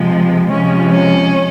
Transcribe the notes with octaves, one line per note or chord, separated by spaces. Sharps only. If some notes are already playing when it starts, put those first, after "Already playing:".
Already playing: C3 F3 G#3
C3 F3 G#3 C#4
C#4